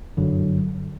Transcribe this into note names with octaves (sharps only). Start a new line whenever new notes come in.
G1 F#2 D3 F#3